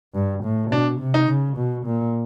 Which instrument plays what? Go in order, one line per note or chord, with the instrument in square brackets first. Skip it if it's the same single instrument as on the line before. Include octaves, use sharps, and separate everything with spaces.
[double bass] G2
A2
[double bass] B2 [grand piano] D4
[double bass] C3
[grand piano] D#4
[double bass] C#3
B2
A#2